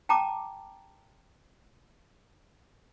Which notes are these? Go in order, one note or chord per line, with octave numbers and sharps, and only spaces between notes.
G5 A5 A#5 D6